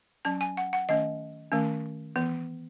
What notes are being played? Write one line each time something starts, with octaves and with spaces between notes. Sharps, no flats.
F#3 C#4 A5
G#5
F#5
F#5
D#3 A3 C#4 D#5
D#3 A3 C#4
E3 B3